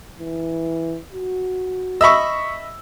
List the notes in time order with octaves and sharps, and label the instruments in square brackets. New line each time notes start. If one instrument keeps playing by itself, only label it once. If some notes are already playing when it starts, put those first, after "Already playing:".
[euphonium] E3
F#4
[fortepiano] D#5 E5 B5 [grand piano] C#6 E6